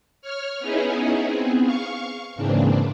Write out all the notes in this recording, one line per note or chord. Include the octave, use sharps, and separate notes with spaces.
C#5 F6
B3 C#4 D#4 E4 G#4
B3 C4 G#4
F5 C#6
G#2 C#3 E3 A#3 C4 D4